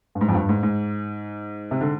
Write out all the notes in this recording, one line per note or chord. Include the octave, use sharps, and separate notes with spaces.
G2
G#2
F2
G2
G#2
G#2
C3
D3